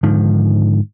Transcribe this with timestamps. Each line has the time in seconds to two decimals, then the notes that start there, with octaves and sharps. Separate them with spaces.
0.03 G#2 D3 D#3 F3